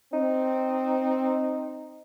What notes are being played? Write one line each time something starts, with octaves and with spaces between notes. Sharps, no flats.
C4 D#4